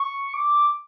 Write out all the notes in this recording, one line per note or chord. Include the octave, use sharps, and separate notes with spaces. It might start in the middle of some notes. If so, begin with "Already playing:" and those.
Already playing: C#6
D6